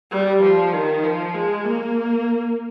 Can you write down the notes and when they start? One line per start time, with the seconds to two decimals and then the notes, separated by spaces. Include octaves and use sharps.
0.11 G3
0.43 F3
0.73 D#3
1.04 F3
1.34 G#3
1.65 A#3